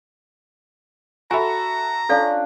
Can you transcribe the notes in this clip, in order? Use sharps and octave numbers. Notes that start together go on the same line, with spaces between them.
F#4 A4 E5 G#5 A#5 B5
C#4 D4 F4 A4 D5 F5